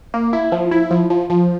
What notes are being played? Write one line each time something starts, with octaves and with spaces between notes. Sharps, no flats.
A#3
E4
F3
E4
F3
F3
F3